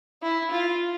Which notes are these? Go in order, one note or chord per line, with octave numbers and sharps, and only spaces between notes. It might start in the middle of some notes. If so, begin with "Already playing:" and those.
E4
F4